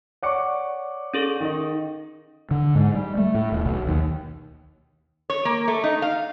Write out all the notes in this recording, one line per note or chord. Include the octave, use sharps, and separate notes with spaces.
C#5 D5 F#5 C#6 D6 C#7
C#4 G#4 A4
D#3 D#4
D3
G#2
G3
A3
A2
D#1
B1
D#2
C#5
A#3
A3
D#4
F5